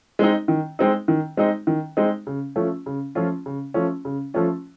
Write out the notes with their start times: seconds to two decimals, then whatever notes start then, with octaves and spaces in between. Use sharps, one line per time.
0.19 G#3 C4 D#4
0.48 D#3
0.79 G#3 C4 D#4
1.08 D#3
1.37 G#3 C4 D#4
1.67 D#3
1.97 G#3 C4 D#4
2.27 C#3
2.56 F3 A3 C#4 F4
2.86 C#3
3.15 F3 A3 C#4 F4
3.46 C#3
3.74 F3 A3 C#4 F4
4.05 C#3
4.34 F3 A3 C#4 F4